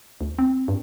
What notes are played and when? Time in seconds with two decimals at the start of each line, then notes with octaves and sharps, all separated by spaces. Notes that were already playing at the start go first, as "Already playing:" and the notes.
0.21 D2
0.39 C4
0.68 G2